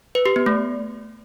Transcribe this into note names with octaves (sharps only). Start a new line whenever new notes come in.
B4
G4
B3
A3